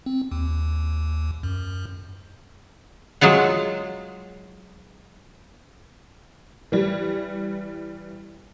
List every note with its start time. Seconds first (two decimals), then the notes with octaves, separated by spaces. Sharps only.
0.06 C4
0.31 D#2
1.43 F#2
3.21 F#3 G#3 F4 F#5
6.72 E3 G3